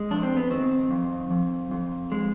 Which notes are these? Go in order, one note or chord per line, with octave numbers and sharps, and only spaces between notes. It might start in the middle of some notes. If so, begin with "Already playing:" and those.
Already playing: G#3
F2 D4
C4
B3
D#3 C4
F2
F2
F2
G#3